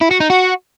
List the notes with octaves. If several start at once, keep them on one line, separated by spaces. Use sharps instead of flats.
E4
F#4
D#4
F#4